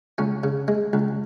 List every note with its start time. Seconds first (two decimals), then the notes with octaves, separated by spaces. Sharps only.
0.18 C#2 C#4
0.44 C#3
0.68 G#3
0.93 C#2